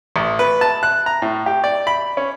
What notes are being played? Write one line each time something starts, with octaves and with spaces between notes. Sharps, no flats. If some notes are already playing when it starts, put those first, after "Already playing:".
A1
B4
A5
F#6
A#5
A2
G4
D5
B5
C#4